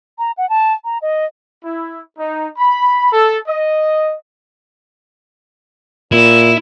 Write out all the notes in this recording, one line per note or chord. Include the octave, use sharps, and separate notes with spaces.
A#5
F#5
A5
A#5
D#5
E4
D#4
B5
A4
D#5
A#2 E4